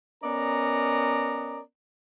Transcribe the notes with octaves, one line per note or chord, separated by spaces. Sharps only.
B3 C#4 A#4 D5 D#5 A#5